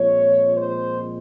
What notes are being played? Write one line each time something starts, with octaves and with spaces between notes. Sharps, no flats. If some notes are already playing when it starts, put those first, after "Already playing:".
Already playing: A#2 F3 G#3 C4 C#5
C5